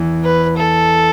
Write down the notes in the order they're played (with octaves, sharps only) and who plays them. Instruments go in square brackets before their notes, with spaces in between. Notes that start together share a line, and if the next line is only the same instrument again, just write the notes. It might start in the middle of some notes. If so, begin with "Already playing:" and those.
Already playing: [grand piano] E2 E3
[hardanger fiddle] B4
A4